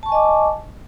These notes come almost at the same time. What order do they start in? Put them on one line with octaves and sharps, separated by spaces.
A5 C#6 G#5 D#5 D6